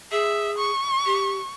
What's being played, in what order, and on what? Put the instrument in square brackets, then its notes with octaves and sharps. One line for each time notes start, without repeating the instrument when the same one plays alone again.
[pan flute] G#4 [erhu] E5
[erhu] C#6
[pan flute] G4